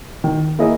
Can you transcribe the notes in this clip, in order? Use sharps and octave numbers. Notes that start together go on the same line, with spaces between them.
D#3
A#3 E4 G#4 D#5